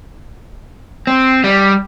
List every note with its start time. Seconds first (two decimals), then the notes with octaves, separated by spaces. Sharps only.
1.07 C4
1.44 G3